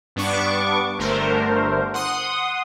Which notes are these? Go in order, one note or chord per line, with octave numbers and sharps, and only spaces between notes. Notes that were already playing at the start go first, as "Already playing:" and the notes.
G2 B3 D4 C#6 D6
G1 D3 A3 A#4 C5
F#5 C6 D#6